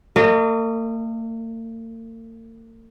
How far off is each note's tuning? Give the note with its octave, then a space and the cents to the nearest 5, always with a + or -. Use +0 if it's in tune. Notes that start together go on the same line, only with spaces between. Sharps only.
A#3 -45 A#4 +0 D#5 -25